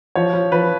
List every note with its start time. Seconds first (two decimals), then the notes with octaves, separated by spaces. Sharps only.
0.15 F3 C#5
0.33 F3
0.52 F3 B4